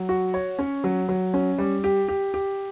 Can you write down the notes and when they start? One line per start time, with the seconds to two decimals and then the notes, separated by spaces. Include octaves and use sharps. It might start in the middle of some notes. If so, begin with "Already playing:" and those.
Already playing: F#3
0.09 F#4
0.34 C#5
0.59 C#4
0.84 F#3
1.09 F#3
1.34 C#4
1.58 G3
1.84 G4
2.09 G4
2.34 G4